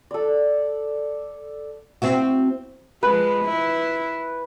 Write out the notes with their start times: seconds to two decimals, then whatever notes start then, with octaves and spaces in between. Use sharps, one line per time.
0.11 A4 D5
2.02 C4 E4 F#4
3.03 F3 G#3 B4
3.45 E4